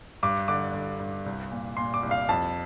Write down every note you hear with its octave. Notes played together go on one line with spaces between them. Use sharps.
G2 D6
D3 D6
D3
G2
C2
A#2
A#2 C6
D6
C2
F5
F2 A5